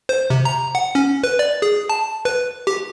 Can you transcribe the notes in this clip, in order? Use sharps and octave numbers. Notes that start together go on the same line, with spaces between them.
C5
C3
A#5
F#5
C#4
B4
D5
G#4
A5
B4
G4